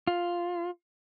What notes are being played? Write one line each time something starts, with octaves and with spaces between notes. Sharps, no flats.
F4